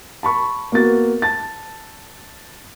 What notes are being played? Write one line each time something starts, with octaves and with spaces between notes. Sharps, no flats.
A5 B5 C#6
A#3 B3 F#4 A6
A5 A6